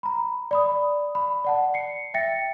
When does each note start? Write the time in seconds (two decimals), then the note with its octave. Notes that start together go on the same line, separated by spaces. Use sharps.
0.03 A#5 B5
0.51 D5 B5 D#6
1.15 B5
1.44 D5 F#5 A5
1.74 C7 C#7
2.14 E5 G5 A6 A#6 C#7